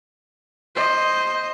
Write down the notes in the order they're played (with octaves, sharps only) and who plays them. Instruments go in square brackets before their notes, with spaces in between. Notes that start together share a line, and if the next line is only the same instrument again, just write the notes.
[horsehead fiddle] C5 D#5